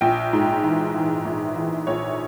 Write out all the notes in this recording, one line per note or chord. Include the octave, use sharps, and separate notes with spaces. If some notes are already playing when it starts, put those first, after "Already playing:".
A#1 G5
G#2
E3
E3
A#1
E3
A#1 C#5